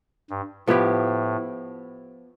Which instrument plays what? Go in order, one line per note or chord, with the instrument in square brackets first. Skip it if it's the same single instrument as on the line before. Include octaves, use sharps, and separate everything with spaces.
[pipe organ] G2
[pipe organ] A2 [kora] F3 B3 E4 G4